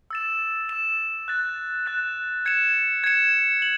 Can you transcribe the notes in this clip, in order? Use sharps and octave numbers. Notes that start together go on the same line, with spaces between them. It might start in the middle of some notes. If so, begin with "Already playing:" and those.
E6 A6 E7
E6 A6 E7
F#6 A6 E7
F#6 A6 E7
G#6 C#7 E7
G#6 C#7 E7
F#7